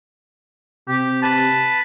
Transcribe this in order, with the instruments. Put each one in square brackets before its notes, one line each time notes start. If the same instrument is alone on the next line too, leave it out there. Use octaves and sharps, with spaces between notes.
[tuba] C3 [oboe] G4
[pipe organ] B4 [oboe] A5